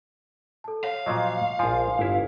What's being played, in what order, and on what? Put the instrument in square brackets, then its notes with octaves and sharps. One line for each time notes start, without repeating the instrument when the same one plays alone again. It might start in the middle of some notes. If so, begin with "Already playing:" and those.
[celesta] A4 A5
[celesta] C#5 [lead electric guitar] F5
[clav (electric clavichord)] A#2 F3 F#3 [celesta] D#5
[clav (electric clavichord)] A#1 F3 [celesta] G#5 C6
[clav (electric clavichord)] G1 E4